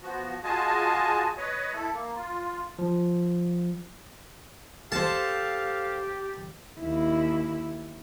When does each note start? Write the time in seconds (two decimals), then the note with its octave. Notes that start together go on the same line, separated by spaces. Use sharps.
0.03 F3 B3 F#4
0.44 F4 F#4 G#4 D#5 G#5 A5
1.37 B4 C#5 D#5
1.73 E4 A4
1.94 A#3
2.16 F4
2.79 F3
4.92 G4 A4 C5 F5 A5
6.79 D#2 E4